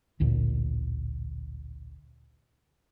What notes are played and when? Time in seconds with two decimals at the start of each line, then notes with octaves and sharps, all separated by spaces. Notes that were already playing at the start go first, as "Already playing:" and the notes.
0.20 A1 D2 A#2 D3